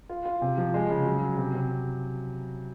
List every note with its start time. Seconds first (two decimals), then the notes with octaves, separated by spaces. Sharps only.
0.09 F4
0.25 F4
0.42 C3
0.58 F3
0.74 G#3
0.90 C#3
1.06 F#3
1.22 F#3
1.38 C3
1.54 C3